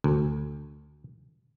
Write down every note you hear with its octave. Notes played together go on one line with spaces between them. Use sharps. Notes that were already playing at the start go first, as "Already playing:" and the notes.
D2